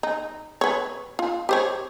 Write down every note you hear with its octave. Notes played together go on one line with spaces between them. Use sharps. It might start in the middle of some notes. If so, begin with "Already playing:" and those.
D#4
B4 C#5
F4
G4 C5 C#5